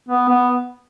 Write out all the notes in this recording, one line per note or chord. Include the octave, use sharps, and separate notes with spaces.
B3
B3